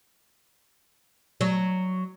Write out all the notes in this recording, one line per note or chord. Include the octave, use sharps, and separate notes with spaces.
F#3